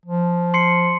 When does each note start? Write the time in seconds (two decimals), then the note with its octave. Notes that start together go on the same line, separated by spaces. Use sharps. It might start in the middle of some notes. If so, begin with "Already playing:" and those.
0.06 F3
0.54 C6 C7 C#7